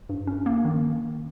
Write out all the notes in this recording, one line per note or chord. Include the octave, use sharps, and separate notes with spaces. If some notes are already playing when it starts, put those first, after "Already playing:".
G2
C#4
A#3
D#3